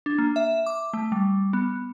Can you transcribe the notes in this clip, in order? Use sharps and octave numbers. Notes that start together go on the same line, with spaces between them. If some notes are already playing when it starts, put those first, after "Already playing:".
D4
A#3
E5
D6
A3
G3
B3